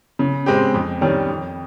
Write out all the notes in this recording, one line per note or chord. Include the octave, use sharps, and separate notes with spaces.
C#3
G#3 C4 G4
F2
D#3 G3 C#4
F2